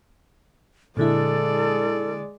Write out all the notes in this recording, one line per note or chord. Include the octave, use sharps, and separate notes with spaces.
A#2 D3 G#3 E4 A4 D5